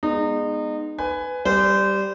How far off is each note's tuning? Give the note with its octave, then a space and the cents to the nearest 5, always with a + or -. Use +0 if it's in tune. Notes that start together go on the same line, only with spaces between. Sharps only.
G#3 +0 B3 -10 D#4 -30
B4 +20 G#5 +0
G3 +0 C5 -25